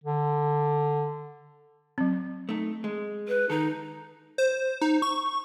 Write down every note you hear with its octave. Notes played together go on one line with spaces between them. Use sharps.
D3
F#3 C4
A3 D#4
G#3
B4
D#3 D#4 A4
C5
D#4
C#6